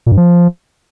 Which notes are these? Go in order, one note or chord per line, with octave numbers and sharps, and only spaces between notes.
A#2
G2
F3